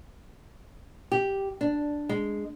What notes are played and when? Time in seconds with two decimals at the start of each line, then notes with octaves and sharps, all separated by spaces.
1.12 G4
1.61 D4
2.09 G#3